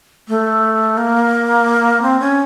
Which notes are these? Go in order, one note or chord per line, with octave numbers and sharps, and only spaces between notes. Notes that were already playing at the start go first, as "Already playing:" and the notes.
A3
A#3
C4
C#4